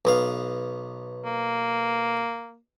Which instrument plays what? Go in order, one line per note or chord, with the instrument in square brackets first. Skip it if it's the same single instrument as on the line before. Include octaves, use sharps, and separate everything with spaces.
[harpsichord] B1 B3 F5
[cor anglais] A#3